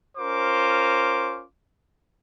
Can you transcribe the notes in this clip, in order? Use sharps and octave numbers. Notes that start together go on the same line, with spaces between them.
C#4 F4 A#4 C5 D6